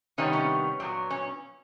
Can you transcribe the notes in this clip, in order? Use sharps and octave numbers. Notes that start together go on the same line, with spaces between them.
C3 D#3 G3 B3 C#4
C#4
A#2 F#3 B3 C4
C#4